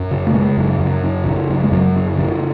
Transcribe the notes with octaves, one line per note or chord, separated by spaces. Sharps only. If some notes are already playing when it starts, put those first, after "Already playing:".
Already playing: F#2
C#3
A3
C#3 G#3
F#2
F#2
C#3
C#3 E3
F#2
G#3
F#2 F#3
C#3
C#3 E3